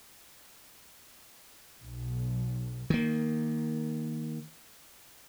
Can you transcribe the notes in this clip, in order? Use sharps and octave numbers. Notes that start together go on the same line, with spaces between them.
B1
D#3 A#3